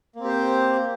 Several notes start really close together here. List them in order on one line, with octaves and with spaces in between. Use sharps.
A#3 C4 G4 C5